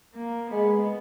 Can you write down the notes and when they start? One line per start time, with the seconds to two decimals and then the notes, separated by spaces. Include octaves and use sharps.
0.14 A#3
0.50 G#3 B3